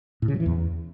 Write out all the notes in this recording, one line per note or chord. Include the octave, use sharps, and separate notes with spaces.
A2
C#3
F#3
E3
E2